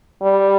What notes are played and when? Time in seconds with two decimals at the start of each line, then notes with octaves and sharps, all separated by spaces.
0.22 G3